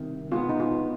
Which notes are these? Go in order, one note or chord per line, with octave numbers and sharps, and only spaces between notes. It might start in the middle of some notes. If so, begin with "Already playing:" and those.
Already playing: C2 C3 D#3
B2 G#3 B3 F4
D#4
F4